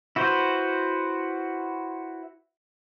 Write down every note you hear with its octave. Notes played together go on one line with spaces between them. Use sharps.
E4 F#4 B4 C5